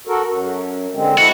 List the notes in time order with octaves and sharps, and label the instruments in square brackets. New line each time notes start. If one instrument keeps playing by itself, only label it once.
[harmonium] F#4 A4 A#4
F#2
D3 G#3 C4
[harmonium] E4 A4 [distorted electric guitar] F#4